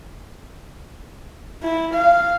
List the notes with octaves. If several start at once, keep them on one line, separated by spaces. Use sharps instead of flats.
E4
F5